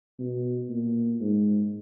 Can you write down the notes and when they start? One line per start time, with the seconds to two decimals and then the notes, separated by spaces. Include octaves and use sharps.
0.19 B2
0.70 A#2
1.21 G#2